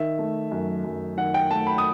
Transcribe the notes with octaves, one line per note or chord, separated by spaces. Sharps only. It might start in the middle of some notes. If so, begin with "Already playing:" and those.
Already playing: D#3 E5
A3
F#2
F#2
D#3 F#5
G5
A3 A5
B5
D#6